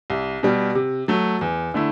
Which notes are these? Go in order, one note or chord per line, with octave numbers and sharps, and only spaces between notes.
C2
B2 G3
C3
F#3 A3
E2
D3 A3 E4